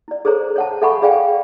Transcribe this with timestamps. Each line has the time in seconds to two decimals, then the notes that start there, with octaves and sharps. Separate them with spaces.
0.08 E4 D5
0.25 G#4 A4 C5 C#5 A#5
0.56 C#5 F#5 A5
0.82 A4 E5 F#5 G#5 B5 C#6
1.02 G#4 D5 F5 G5 G#5